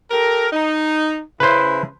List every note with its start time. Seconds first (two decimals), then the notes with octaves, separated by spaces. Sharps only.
0.10 G4 A4 A#4
0.52 D#4
1.40 C#3 E4 B4 C5